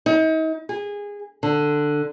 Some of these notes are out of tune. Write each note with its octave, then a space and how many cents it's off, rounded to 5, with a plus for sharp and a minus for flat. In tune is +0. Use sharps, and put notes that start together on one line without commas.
D#4 +40
G#4 -20
D3 +10